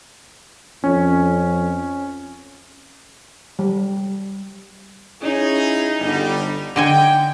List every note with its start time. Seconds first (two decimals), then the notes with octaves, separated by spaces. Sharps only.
0.84 F2 C#4
3.59 G3
5.22 C#4 D#4 E4 G#4
5.99 G1 D3 G3
6.76 D3 D#5 G5 G#5